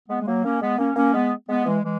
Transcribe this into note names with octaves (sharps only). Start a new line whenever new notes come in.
G#3 B3
G#3
F#3 A#3
A#3 C#4
G#3 B3
A#3 C#4
A#3 C#4
G#3 B3
G#3 B3
E3 G#3
E3 G#3